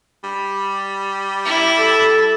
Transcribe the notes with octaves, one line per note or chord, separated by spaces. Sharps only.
G3
E4
A4